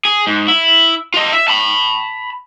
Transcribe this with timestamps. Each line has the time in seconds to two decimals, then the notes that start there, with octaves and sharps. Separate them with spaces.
0.05 G#4
0.27 G#2
0.48 E4
1.14 F4 D#5
1.33 E5
1.48 A5 B5